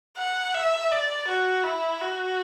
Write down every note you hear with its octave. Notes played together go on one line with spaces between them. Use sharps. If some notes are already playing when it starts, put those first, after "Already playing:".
F#5
E5
D5
F#4
E4
F#4